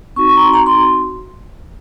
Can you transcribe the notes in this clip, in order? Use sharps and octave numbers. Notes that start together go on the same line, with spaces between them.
C4 D#4 F#4 C#6
C#6
A#5
C6
A#5
C6